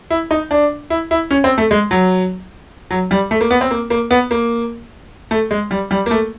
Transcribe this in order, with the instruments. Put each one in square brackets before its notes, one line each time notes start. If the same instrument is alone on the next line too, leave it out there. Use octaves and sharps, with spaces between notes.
[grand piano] E4
D#4
D4
E4
E4
C#4
C4
A3
G#3
F#3
F#3
G3
A3
A#3
B3
C4
A#3
A#3
B3
A#3
A3
G#3
G3
G3
A#3
A3